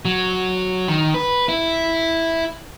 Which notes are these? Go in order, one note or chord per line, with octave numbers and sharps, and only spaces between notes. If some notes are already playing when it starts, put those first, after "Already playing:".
F#3
D#3
B4
E4